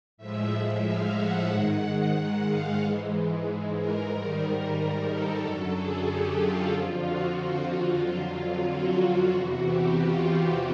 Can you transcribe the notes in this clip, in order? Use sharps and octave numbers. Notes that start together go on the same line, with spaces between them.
A2 F3 G#3 E5
F5
F#5
G#2 D#3 G#3 F#5
F5
G#2 E3 G#3
A#4
G#2 D#3 G3
A4
F#2 D3 F#3
G#4
G4
F4
F2 D3 F3
F#4
F4
F2 D3 F#3
F#4
E2 C3 E3
G4
F4
F4